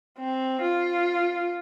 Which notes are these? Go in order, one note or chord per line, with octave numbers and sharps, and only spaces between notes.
C4
F4